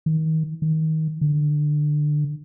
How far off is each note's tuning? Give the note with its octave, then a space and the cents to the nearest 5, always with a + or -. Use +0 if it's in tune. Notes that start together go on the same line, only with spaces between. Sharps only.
D#3 +30
D#3 +25
D3 +20